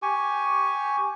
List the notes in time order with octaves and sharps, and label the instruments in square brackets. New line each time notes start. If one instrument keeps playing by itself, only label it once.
[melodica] G4 G#5 C#6